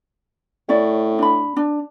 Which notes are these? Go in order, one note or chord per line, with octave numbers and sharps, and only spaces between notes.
A2 C#4 D5
D4 B5
D4